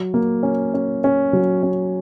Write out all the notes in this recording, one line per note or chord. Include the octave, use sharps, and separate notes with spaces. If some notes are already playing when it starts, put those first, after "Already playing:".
Already playing: F#3
A#3
C#4
C#4
C#4
F#3
C#4